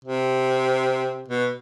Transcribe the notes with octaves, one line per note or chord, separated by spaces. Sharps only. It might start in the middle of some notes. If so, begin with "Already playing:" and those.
C3
B2